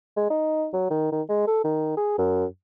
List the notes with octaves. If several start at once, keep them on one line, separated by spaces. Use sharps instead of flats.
G#3
D#4
F#3
D#3
D#3
G#3
A4
D#3
G#4
F#2